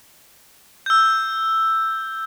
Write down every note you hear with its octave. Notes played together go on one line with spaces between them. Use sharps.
E6 G6